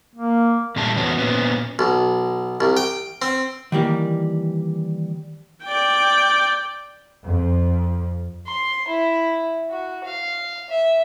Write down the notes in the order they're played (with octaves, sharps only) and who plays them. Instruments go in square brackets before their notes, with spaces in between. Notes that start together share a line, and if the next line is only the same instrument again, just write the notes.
[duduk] A#3
[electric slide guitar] A#2 C#3 G3 A3 A5
E2 B3 C#4 F#4
A#2 B3 C#4
[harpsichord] B1
C2
G5
C4
[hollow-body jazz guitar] D#3 E3 G3 A#3
[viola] D5 G5
[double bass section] F2
[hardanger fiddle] C6
E4
F#4
F5
E5